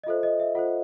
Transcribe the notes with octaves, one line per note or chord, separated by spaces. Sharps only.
D#5
F4 A4 C5 E5
D#5
E5
F4 A4 C5 F#5